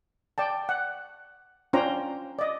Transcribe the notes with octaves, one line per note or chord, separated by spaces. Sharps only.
D5 G5 A5
F#5
C#4 D4 F4 C5 G5 A#5
D5 D#5